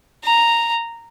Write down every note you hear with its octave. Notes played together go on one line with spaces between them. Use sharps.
A#5